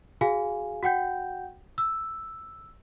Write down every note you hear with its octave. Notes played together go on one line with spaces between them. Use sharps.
F#4 G#4 F5 G#5
F#4 F#5 G5 G6
E6